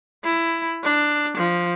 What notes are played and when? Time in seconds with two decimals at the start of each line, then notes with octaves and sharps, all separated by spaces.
0.24 E4
0.84 D4
1.37 F3